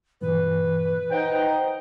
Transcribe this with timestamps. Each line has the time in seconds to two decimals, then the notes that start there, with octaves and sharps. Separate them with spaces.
0.21 G2 A#2 E3 B4
1.11 D#4 C5 F#5 G5